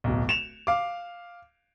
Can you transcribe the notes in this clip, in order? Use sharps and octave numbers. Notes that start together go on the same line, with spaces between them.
D1 B1
E7 F7
F5 D6